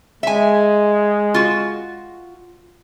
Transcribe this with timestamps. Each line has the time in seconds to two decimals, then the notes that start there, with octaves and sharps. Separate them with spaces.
0.23 G#3 E5 G#5
1.34 F4 F#4